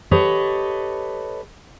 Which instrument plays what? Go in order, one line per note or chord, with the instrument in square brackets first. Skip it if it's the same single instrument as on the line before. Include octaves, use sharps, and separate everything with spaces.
[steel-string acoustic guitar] G4 A4 B4 C#5 D#5